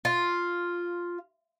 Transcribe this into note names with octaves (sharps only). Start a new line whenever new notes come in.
F4